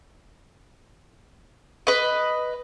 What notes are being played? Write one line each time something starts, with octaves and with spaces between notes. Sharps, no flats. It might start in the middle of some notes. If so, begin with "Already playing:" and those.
B4 D#5